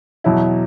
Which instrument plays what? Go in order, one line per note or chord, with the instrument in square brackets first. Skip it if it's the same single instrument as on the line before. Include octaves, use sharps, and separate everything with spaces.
[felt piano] E2 B2 F#3 E4